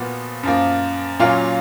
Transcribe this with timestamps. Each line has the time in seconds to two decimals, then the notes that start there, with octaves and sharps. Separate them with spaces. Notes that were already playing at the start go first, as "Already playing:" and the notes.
Already playing: A#2 F3 B3 F#4
0.43 F#2 F3 A#3
1.19 A#2 F#3 A#3 C#4 F4